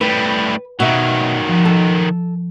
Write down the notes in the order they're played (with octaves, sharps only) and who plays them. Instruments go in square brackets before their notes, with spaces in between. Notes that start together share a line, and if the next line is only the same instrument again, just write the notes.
[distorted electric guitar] A2 G3 [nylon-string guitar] B4
[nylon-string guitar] B2 E5 [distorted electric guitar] D#3 F#3
[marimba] F3
[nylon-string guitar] A4